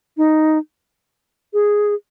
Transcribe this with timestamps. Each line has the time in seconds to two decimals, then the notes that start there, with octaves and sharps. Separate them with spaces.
0.17 D#4
1.53 G#4